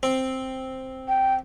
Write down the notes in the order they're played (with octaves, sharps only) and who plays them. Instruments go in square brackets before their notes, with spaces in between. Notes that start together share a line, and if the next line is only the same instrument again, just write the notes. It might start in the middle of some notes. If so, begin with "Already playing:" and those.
[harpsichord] C4
[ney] G5